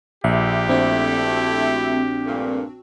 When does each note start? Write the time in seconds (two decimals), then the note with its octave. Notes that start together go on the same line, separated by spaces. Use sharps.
0.24 A#1 G4 E5
0.69 A3 C4 D4 E4 F#4
2.26 G2 A#2 A3